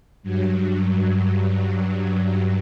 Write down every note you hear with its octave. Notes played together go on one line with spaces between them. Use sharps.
G2 F#3